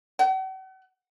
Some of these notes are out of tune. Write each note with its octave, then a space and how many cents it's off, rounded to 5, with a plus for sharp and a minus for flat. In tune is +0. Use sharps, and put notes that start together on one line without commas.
F#5 +45